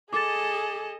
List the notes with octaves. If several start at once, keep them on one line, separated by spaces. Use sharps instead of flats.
G#4 A4 D#5 D6 A6